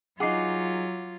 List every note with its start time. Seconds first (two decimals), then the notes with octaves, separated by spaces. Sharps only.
0.20 F#3 D#4 F4 G#4 F#5 D6 C7